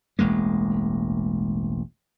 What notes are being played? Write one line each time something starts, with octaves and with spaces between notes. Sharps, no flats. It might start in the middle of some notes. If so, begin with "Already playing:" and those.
E1 A1 G#3 A#3